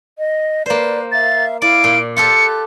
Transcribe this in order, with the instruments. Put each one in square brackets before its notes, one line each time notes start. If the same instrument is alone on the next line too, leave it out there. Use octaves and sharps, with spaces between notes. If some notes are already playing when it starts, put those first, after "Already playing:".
[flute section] D#5
[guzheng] A#3 C5 [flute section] B4 D5 F#6
[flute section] E5 F5 [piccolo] A6
[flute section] E4 F5 [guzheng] D5 [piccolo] D7
[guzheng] A#2
[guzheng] F4 G4 A4 [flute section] F#6 [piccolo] C#7